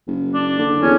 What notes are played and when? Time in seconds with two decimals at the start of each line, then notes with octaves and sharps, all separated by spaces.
0.07 F#1
0.34 D4
0.58 D3
0.82 E2 C#4